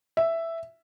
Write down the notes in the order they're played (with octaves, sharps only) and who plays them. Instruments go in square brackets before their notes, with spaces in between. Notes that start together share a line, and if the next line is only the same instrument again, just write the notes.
[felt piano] E5